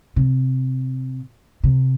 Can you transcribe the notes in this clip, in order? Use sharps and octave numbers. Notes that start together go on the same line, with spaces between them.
C3
C3